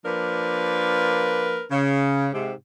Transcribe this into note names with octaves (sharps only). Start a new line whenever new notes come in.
F3 A#3 D4 A#4 B4
C#3
G#2 C3